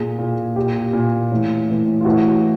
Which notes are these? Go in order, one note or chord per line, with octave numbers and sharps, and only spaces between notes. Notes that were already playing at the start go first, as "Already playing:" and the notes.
Already playing: A#2 G#4
A#2
A#2 G4
A#2
A2 E3
A2 E3
F4
A2 E3 F#4